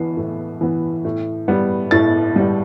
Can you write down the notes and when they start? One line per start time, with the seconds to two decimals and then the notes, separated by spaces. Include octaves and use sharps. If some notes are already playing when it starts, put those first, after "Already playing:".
Already playing: E3 B3 C7
0.17 A2
0.61 E3 B3
1.05 A2
1.48 G3 B3
1.91 A2 A6
2.36 G3 B3